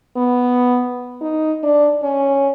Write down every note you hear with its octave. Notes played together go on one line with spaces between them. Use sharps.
B3
D#4
D4
C#4